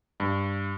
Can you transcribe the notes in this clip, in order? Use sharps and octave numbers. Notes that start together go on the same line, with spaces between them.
G2